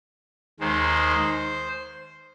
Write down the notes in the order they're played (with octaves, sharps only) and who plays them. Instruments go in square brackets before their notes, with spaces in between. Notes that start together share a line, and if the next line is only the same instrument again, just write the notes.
[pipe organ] D#2 D#3 G#3 C5